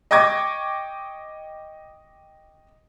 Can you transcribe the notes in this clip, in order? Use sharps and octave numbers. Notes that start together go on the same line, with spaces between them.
D#5 G5 C#6 D6 G#6 A#6